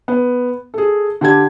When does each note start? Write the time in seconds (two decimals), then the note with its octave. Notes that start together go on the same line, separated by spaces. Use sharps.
0.08 B3
0.74 G#4 A4
1.21 D3 G4 A5 G#6